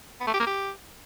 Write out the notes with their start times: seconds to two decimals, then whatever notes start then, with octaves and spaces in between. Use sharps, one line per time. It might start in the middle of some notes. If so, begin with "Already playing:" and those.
0.20 B3
0.27 A3
0.33 G4
0.40 A#3
0.46 G4